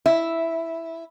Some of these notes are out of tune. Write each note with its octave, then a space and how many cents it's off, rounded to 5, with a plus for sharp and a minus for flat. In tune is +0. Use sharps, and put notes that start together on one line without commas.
E4 +0 E5 +0